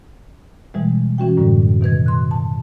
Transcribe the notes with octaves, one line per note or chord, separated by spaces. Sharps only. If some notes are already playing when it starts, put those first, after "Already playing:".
B2 E3 G3 G#3
E3 C#4 F#4 G5
F#2 A2 D3 G3
B2 D#3 B4 G#6
C6 F#6
A5